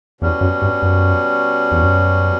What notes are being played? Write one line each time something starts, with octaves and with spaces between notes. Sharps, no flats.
E2 B2 G3 C#4
F#2
G2
F#2
E2
F#2